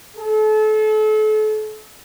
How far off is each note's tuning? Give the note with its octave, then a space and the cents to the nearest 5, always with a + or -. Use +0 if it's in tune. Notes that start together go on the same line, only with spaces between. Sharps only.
A4 -35